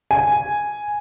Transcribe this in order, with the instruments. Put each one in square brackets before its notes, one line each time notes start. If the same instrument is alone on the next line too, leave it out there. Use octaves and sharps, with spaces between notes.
[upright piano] G#5